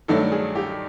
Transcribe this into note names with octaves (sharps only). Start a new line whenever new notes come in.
G2 D#3 F#3 A3 D4 A4
G#4
G4